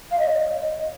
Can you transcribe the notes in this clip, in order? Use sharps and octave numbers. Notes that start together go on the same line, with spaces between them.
F5
D#5
C#5
D#5